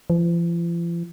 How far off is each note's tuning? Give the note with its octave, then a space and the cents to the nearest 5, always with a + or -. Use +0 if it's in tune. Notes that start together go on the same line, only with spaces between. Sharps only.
F3 -45